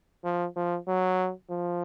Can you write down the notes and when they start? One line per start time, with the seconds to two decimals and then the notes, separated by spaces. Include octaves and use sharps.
0.24 F3
0.56 F3
0.87 F#3
1.51 F3